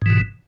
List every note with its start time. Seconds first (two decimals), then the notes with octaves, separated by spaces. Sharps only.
0.02 G#2
0.06 E3
0.10 B2